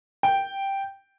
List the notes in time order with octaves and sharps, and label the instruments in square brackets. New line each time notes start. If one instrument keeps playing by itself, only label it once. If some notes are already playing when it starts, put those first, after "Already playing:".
[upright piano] G5